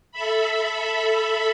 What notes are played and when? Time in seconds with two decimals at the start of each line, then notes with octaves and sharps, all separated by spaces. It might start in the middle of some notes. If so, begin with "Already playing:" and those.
0.12 A4 E5 B5